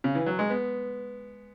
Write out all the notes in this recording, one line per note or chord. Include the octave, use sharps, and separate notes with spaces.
C#3
E3
F#3
G#3
B3